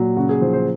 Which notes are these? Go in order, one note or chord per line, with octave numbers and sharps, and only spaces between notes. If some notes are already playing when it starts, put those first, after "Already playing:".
Already playing: A#2 F#3
C#3 F#4
G#4
F3 C5
C5